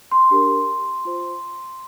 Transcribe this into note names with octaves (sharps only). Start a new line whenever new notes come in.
C6
D4 G4 A#4
F4 C5